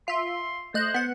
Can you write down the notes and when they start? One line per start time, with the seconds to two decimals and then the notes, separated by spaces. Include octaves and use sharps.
0.08 F4 E5 C6
0.74 A3 C5 D#5 F#6
0.94 B3 F#5